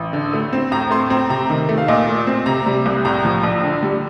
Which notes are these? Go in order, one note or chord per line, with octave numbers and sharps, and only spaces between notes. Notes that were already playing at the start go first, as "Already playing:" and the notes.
Already playing: A1
D3
A3
C4
A2 A#5
A3 C6
C4 A#5
C3 A#5
D#3
A3
F5
A#2 D#5
A3
C4
C3 A#5
G3
C2
A2 A#5
F3
A#1
D3
G3